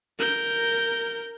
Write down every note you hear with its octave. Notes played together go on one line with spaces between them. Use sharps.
A#4 G6